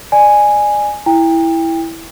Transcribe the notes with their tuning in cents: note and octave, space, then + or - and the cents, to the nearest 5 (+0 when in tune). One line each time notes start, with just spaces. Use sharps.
D5 +25 G#5 +0
E4 +0 G5 +30